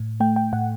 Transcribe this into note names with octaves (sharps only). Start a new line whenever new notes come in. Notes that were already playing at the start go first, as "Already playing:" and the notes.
Already playing: A2
A3 G5
G5
A2 F#5